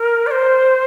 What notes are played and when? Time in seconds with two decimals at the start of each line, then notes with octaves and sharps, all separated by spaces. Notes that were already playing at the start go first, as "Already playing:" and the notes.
Already playing: A#4
0.27 D5
0.31 C5